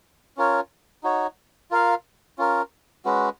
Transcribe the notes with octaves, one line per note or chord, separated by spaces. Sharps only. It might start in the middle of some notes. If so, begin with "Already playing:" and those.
C#4 F4 A#4 C#5
D#4 F#4 C#5
F4 A#4 F5
C#4 F4 A#4
G#3 C#4 F#4 B4